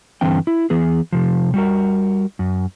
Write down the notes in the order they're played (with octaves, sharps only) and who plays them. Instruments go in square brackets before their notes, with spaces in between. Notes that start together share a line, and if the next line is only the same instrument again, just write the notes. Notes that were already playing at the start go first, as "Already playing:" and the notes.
[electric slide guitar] G2 D3 E3 C4 G5
E4
E3 B3 G#4
C3 F3
G3 F#4 A#4
F#2